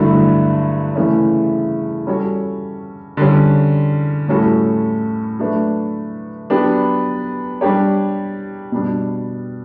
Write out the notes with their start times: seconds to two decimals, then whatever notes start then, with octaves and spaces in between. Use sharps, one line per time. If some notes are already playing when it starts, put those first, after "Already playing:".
Already playing: G2 D3 F#3 A3 E4
0.96 C#3 E3 A3 C#4
2.07 G3 C#4 F#4 A4 C#5
3.17 D3 G3 C#4
4.28 A2 G3 C#4 F#4 A4
5.39 F#3 A3 D4 F#4 B4
6.50 F#3 B3 D4 G4 B4
7.61 G3 D4 G4 C#5
8.72 B2 G3 D4